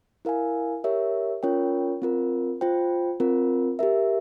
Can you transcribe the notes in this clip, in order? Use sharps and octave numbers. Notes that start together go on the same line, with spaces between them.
E4 A#4 F5 G#5
G4 A#4 C#5 E5
C#4 F4 A#4 C#5 G5
C4 F4 A#4
F4 C5 G5
C4 F4 A#4
G4 A#4 E5